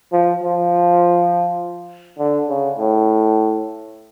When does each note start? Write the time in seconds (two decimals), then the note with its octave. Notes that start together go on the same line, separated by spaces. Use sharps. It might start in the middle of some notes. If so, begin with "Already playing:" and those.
0.12 F3
0.42 F3
2.18 D3
2.49 C#3
2.78 A2